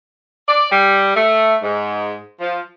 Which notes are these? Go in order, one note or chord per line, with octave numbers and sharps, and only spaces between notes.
D5
G3
A3
G#2
F3